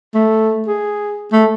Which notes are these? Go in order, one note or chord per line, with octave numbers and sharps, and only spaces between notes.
A3
G#4
A3